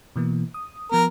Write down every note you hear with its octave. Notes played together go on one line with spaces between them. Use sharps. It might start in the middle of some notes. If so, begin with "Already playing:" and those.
B2 E3 A#3
D#6
F3 B3 A#4